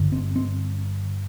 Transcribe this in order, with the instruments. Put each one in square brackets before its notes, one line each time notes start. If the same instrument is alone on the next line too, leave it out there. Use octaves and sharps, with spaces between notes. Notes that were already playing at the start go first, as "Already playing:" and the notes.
Already playing: [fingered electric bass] G2 D3
C4
C4